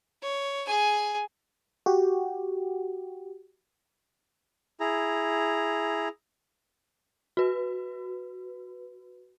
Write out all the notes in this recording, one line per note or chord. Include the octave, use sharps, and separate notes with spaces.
C#5
G#4 G#5
F#4 G4
E4 G#4 A#5
F#4 B4